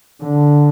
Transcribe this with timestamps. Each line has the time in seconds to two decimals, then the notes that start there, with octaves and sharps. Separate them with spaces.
0.24 D3